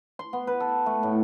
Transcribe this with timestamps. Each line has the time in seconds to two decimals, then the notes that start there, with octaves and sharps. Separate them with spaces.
0.19 C6
0.33 B3
0.47 B4
0.60 A4
0.86 A3
1.03 A2